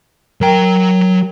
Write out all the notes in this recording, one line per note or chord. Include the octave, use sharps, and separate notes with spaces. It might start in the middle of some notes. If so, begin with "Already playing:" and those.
F#3 A#4 G5 A#5